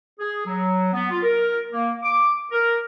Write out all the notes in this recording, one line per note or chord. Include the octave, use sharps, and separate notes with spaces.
G#4
F#3
B3
F4
A#4
A#3
D6
A#4